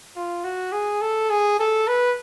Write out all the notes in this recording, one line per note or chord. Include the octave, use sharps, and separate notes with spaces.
F4
F#4
G#4
A4
G#4
A4
B4